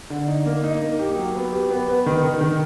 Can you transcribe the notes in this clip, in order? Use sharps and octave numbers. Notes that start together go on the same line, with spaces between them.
D3
D#4
A#3
D#4
A#3
G4
F#3
B3
G4
B3
B3
D#3
D#3
D#3